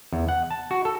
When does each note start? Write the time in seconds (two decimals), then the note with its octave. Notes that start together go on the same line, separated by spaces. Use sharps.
0.13 E2
0.29 F#5
0.50 A5
0.71 F#4
0.85 A4